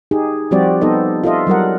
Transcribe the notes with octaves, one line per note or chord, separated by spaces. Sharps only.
D#4 G4 G#4
F3 G3 C4 F#4 G4 D5
B3 D#4 A4 C5 D#5
F4 A4 D#5 E5
F#3 G3 A#4 F#5